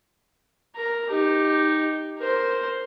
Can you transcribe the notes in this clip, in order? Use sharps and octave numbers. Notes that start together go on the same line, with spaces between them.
A#4 A#5
D#4 G4
A#4 C5